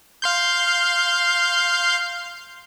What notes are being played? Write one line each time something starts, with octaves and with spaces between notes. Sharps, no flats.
F5 C6 G6